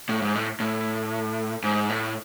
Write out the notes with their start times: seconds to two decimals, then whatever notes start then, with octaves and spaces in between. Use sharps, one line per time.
0.09 A2
0.22 G#2
0.35 A2
0.60 A2
1.64 G#2
1.89 A2